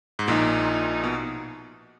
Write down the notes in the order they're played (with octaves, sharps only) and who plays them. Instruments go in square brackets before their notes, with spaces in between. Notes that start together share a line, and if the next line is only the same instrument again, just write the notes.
[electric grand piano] G#2
[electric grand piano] A#1 A#2 [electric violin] D#4
[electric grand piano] B2